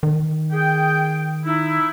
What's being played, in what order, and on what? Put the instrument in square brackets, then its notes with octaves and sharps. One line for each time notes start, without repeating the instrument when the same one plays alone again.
[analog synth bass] D#3
[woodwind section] G#4 G5
D#4 E4